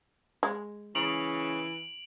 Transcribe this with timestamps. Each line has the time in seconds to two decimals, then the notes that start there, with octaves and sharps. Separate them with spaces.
0.43 G#3
0.95 C#3 E3 D7 F7 F#7